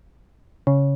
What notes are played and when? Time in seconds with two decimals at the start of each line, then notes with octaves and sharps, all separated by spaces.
0.67 C#3